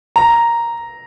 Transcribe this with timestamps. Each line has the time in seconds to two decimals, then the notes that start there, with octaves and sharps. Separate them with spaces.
0.16 A#5